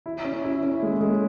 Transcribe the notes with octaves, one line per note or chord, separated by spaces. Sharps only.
E4
C#4
E4
C#4
G#3
G#3